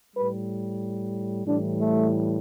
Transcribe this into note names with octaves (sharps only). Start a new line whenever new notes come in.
A2 G3 B4
A2 E3 G3 D4
A3